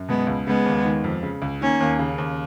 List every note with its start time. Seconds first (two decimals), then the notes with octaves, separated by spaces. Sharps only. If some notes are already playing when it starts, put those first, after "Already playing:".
Already playing: F#2
0.08 B2 G#3 B3
0.27 C#2
0.47 C#3 G#3 B3
0.66 D#2
0.85 D#3
1.04 F2
1.23 C#3
1.42 C#2
1.61 D#3 A#3 C#4
1.80 D#2
1.99 C#3
2.18 D#2